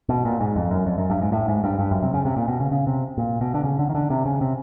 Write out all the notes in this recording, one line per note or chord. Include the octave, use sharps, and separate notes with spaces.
B2
A#2
G#2
F2
F#2
F2
F#2
G2
G#2
A2
G#2
G2
G2
F#2
C3
C#3
C3
A#2
B2
C#3
C#3
C3
A#2
B2
D3
C#3
D3
D#3
D3
C3
C#3
C3